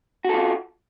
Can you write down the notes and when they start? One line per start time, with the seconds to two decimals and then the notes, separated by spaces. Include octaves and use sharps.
0.25 F#4
0.29 A4
0.34 F4